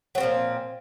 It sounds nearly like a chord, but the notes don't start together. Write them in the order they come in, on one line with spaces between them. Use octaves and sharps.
F#3 C4 F3 A#2